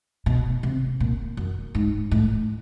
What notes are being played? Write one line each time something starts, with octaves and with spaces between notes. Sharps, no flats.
B2
C3
A#2
F#2
G#2
A2